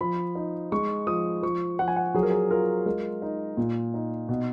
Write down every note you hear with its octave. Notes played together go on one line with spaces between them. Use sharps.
F3 B5
D#4
G#3 C#6
F3 D#6
F3 C#6
F3 F#5
G#5
F#5
F#3 G#4
A#4
G#4
F4 A#4
G#3 A#4
D#4
A#2
D#4
B2